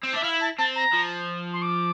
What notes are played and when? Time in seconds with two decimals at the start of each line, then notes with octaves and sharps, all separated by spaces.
0.03 C4
0.13 D4 E5
0.23 E4 F5
0.41 A5
0.58 C4 A5
0.75 A#5
0.93 F3
1.53 C6
1.62 D6